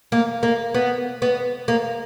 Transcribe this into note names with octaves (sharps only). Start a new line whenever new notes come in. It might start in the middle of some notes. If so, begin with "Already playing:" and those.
A#3
A#3
B3
B3
A#3